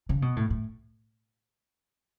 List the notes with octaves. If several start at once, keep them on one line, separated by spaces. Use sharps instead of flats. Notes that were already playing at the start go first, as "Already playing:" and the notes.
C#3
B2
A2
A2